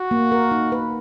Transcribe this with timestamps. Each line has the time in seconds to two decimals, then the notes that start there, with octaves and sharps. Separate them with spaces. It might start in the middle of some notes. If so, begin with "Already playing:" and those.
Already playing: F#4
0.11 A#3
0.32 A#4
0.51 D#4
0.72 B4